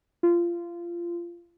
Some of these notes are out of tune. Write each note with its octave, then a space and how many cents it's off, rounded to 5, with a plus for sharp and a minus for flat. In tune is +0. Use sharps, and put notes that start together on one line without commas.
F4 -25